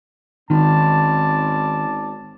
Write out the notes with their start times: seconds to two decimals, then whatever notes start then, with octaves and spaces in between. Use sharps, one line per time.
0.50 G#1 D#3 C#4 D5 A5